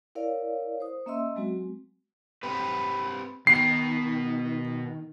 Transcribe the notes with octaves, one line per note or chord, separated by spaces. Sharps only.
E4 A#4 C#5 D5 F5
C5 D#6
A#3 C#4 D#5 E5 C6 E6
F#3 G#3 C4 F#4
C4 G4 B4
B2 D#3 C7